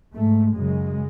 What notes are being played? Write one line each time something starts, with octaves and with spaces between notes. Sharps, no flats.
G#2 A3
F#2 C#3 G#3